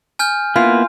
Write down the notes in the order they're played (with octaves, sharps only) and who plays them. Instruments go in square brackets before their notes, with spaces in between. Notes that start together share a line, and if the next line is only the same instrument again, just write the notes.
[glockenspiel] G#5 F6 G6
[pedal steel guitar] A#3 B3 E4 [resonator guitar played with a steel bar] F4